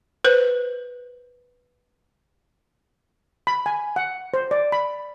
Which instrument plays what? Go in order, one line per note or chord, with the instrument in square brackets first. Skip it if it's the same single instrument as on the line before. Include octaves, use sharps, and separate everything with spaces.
[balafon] B4 C5
[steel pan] B5
G#5
F#5
C5
D5
B5